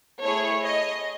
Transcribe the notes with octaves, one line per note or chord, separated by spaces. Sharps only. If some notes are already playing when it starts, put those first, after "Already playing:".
A3 E4 G#4 C#5
D#5